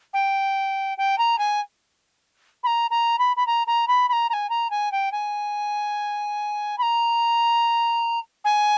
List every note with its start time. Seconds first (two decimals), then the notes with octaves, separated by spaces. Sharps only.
0.13 G5
0.98 G5
1.18 A#5
1.38 G#5
2.63 B5
2.67 A#5
2.90 A#5
3.19 B5
3.36 B5
3.47 A#5
3.67 A#5
3.88 B5
4.09 B5
4.13 A#5
4.29 A#5
4.33 G#5
4.49 A#5
4.70 G#5
4.92 G5
5.12 G#5
6.78 B5
6.82 A#5
8.44 G#5